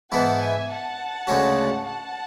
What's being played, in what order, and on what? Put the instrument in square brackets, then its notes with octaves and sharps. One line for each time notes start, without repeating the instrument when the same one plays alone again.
[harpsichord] G#2 E3 B3 E4 [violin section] F#5 A5
[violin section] E5 G#5
F#5 A5
[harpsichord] D2 C#3 G#3 C#4 F#4
[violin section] F#5 A5